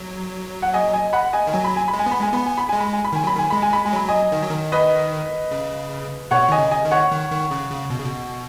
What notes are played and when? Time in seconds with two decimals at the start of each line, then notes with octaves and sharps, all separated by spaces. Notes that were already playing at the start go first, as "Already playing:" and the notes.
Already playing: F#3
0.62 F#5
0.74 D#5 G#5
0.93 D#5 G#5
1.13 F#5 B5
1.33 D#5 G#5
1.47 D#3
1.53 F#3 G#5
1.64 B5
1.76 G#5
1.88 B5
1.94 G#3
1.99 G#5
2.06 B3 B5
2.19 G#3 G#5
2.33 B3 B5
2.46 G#5
2.57 B5
2.69 G#3 G#5
2.80 B5
2.93 G#5
3.04 B5
3.12 D#3 G#5
3.24 F#3 B5
3.35 D#3 G#5
3.50 G#3 B5
3.62 G#5
3.73 B5
3.85 G#3 G#5
3.93 F#3 B5
4.08 D#5 G#5
4.32 D#3
4.42 F#3
4.50 D#3
4.72 B4 D#5
5.51 C#3
6.31 B2 C#5 F#5
6.49 D#3 D#5 G#5
6.58 C#3
6.71 D#5 G#5
6.85 D#3
6.91 C#5 F#5
7.11 D#3
7.32 D#3
7.51 C#3
7.71 C#3
7.90 B2
7.98 C#3
8.06 B2